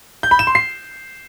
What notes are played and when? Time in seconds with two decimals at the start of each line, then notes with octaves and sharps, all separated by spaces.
0.23 G6
0.31 B5
0.39 E7
0.47 C6
0.55 C7